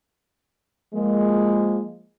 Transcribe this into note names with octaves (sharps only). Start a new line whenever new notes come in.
F3 G#3 A#3